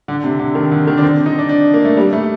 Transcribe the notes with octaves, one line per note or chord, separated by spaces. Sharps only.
D3
C3
D3
D#3
D3
D#3
D4
C4
D#4
D4
D4
A#3
A3
G3
A3